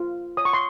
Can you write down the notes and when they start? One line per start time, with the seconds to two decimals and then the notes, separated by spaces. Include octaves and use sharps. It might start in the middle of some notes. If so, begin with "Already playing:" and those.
Already playing: F4
0.37 C#5 D#6
0.45 C#6
0.53 C6